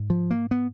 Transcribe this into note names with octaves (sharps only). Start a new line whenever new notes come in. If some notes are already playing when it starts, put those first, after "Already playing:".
Already playing: G#2
F3
A#3
B3